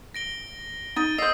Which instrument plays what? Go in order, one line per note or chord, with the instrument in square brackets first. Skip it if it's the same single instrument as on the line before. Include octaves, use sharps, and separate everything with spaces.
[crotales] A#6 D7 G7
[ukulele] D#4 [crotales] A6 D#7 G7
[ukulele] C5 D#5 [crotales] D#6 E6 C7